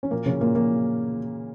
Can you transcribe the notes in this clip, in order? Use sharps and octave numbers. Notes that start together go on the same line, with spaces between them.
C#4
A#2 A#3
C#3 C#4
A#2 A#3
A#2 A#3